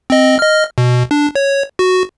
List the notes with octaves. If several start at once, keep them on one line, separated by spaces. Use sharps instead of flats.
C4 D#5
D#5 F6
B2
D4
C#5
F#4